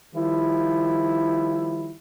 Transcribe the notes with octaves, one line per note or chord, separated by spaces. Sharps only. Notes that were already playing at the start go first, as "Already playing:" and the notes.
D#3 F3 G3 E4